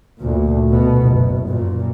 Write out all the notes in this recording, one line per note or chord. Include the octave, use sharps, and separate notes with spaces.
D2 A#2
B2 B3
F#1
F#2 A#2